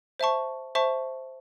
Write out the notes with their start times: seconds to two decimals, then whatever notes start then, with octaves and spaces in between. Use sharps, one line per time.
0.20 C5 E5 A5 C#6
0.75 C5 E5 A5 C#6